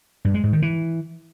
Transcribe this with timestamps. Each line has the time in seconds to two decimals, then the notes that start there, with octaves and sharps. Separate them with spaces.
0.25 G2
0.34 G#3
0.43 G#2
0.53 D#3
0.62 E3